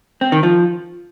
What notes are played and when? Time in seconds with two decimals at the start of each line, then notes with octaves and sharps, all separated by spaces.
0.21 C4
0.32 D#3
0.43 F3